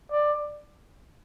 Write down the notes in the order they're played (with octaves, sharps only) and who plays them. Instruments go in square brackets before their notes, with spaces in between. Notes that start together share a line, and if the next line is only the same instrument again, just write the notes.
[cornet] D5